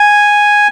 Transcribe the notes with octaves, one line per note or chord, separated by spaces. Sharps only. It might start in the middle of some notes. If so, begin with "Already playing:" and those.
Already playing: G#5